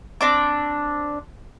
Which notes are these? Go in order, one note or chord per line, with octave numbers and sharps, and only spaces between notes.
C4 D4 D6